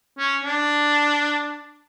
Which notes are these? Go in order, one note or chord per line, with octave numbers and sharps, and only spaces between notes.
C#4
D4